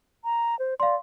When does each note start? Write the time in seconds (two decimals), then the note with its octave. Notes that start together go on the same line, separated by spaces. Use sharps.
0.24 A#5
0.59 C5
0.80 D5 F5 C6